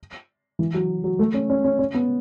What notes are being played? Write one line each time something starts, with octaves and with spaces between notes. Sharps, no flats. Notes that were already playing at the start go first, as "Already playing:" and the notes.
E3
F#3
F#3
A3
C#4
C#4
C#4
C#4
B3